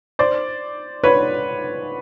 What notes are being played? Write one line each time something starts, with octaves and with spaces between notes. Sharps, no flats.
C5 D5
B4 C#5